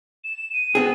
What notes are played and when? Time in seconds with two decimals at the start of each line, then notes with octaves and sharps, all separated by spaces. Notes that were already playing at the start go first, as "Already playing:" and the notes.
0.24 E7
0.53 D#7
0.75 B3 C4 G#4